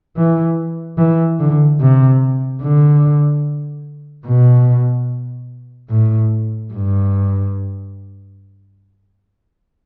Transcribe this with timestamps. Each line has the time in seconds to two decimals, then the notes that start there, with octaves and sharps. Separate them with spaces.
0.17 E3
0.98 E3
1.40 D3
1.81 C3
2.62 D3
4.26 B2
5.90 A2
6.73 G2